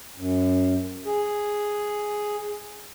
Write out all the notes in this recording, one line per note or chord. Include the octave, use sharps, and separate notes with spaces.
F#2
G#4